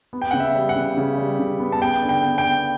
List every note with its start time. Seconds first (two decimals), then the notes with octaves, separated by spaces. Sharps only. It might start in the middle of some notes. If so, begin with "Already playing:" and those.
0.13 B3
0.22 G5
0.31 C#3 F#5
0.40 E5
0.55 G3
0.69 F#5
0.76 C#3
0.97 C#3
1.18 G3
1.40 C#3
1.60 B3
1.72 A5
1.81 B3 G5
2.02 D3
2.09 G5
2.23 B3
2.38 G5
2.44 B3